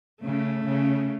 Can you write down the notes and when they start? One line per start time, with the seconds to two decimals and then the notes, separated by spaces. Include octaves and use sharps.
0.22 C#3 A3
0.65 C#3